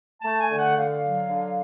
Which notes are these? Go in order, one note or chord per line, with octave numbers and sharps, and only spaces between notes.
A3 A5
G#5
D3
F#5
D3 F5
F#3
D3